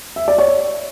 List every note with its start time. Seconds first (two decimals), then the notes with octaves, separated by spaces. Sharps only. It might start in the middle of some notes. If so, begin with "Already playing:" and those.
0.16 E5
0.28 D5
0.38 C#5